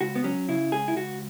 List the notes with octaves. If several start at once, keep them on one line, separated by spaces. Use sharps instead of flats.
C#2 F#4
B3
F#3 C#4
C#3 E4
C#2 G#4
E4
C#2 F#4